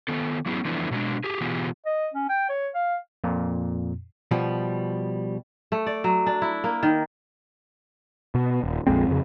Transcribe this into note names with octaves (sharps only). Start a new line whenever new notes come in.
D#3 B3 A4
F#3 B3 C#4 E4 G#4
E3 F3 A3 B3 D4 E4
B2 F#3 G#3 D4
G4 G#4
B2 E3 B3 F4 G4 G#4
D#5
C#4
G5
C#5
F5
F2 A#2
B2 F3 G3
A3
D5
F#3
D4
E4
A#3
D#3
B2
D#1
A#1 F2 G#3 C4
F2 C#3